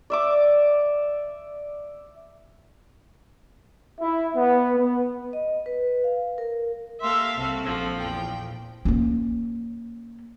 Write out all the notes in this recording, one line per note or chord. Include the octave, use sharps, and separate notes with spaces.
D5 E5 D6
E4
B3
B3
D#5
B4
F5
A#4
A#3 G4 A4 E5 F5 C6 E6
C2 C4 F#4 A4
A#1 F3
E2 G5
A#3 C#4